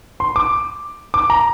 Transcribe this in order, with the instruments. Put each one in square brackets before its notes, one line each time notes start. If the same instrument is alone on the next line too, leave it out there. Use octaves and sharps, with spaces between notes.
[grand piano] C6
D6
D6
A#5